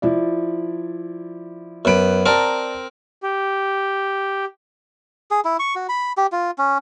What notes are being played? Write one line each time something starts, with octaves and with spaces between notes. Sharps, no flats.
F3 E4 D5
F#2 B3 B4 D7
C4 A#4 D5 A5 A#5
G4
G#4
E4
C#6
F#4
B5
G4
F4
C#4